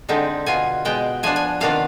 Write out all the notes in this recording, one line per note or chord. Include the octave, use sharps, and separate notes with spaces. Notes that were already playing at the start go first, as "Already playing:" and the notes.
D3 G#3 C4 D#4
B2 B3 F4 G#5
B2 G#3 B3 G5
F3 B3 D4 F4 G#5
G#5
C3 D#3 B3 D4 F4 F5